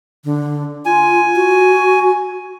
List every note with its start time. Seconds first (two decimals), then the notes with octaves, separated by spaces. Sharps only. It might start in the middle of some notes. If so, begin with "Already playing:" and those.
0.24 D3
0.86 F4 G#5
1.36 F#4